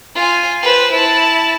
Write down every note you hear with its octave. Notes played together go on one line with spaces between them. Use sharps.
F4 G#5
B4 C5
E4 A5